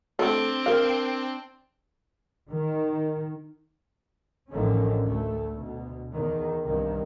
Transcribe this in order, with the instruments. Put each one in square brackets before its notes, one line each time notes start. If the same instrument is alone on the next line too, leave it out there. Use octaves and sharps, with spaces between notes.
[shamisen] A3 A4 [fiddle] C4 D4
[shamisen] A#4 F5
[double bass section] D#3
A1 D3 D#3 F3 A3 C#4
D2 A3
D2 B2
E2 D#3
C2 G2 D#3